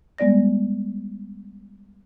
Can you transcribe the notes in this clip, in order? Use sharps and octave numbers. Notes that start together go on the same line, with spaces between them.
G3 G#3 B3 D5 A#6